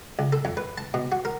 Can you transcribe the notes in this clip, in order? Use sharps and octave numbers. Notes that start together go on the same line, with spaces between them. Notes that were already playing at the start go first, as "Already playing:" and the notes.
C#2
A4
F2
B4
A5
B2
F#4
A#4